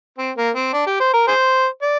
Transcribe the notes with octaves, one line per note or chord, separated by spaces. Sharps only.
C4
A#3
C4
D4
G4
C5
A#4
G#4 C5
D5